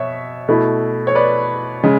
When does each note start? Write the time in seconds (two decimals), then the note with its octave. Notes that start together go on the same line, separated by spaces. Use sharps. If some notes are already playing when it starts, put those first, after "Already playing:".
Already playing: B2 C#5 E5
0.48 B2 A3 E4
1.07 C#5
1.15 B4 D5
1.83 C#3 G#3